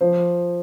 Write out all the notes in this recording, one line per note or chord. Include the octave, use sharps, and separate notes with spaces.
F3 C5